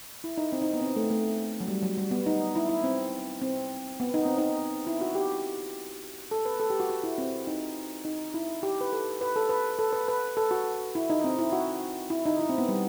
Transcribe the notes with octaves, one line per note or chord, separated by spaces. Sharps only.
E4
D#4
C4
D#4
B3
C4
A3
A3
F#3
G3
F#3
G3
B3
D#4
E4
E4
C4
C4
B3
D#4
C4
D#4
E4
F#4
G4
A4
B4
A4
G4
F#4
F#4
E4
C4
D#4
D#4
E4
G4
B4
A4
B4
A4
B4
A4
B4
B4
A4
F#4
E4
D#4
C4
E4
F#4
E4
D#4
E4
C4
B3
G3